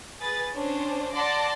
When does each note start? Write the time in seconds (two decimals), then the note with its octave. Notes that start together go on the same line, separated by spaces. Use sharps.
0.20 G#4 B4 A6
0.55 C#4 D4 C5
1.13 D5 F#5 A5 C6 D6 A#6